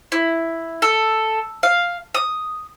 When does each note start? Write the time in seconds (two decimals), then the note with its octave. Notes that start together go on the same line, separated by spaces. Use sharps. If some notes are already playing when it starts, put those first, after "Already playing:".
0.12 E4
0.82 A4
1.63 F5
2.14 D#6